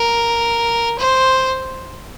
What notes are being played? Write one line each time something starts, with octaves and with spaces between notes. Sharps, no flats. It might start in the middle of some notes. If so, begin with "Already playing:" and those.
Already playing: A#4
C5